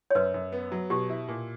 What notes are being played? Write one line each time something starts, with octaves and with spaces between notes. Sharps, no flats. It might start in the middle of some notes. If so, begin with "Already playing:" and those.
C#5
F#2 B4
F#2
B3
F#3
B2 G4
E4
A#2